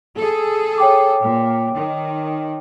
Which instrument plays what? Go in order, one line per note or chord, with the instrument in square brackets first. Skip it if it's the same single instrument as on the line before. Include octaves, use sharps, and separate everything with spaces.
[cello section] G#4 A4
[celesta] C#5 G5 D6
[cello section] A#2
D#3